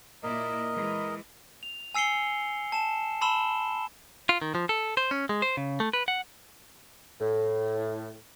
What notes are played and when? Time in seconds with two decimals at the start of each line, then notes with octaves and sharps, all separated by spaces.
0.23 A#2 E4 A#4 D5 D#5
0.75 E3 G#3
1.63 F7
1.94 G#5 E6 C7 C#7 G7
2.72 A5 E7
3.21 A5 B5 C6 E6 E7 G7
4.29 F4
4.42 D#3
4.55 F3
4.69 A4
4.97 C5
5.11 C#4
5.29 G#3
5.42 C5
5.57 C#3
5.80 A3
5.93 B4
6.08 F#5
7.20 A2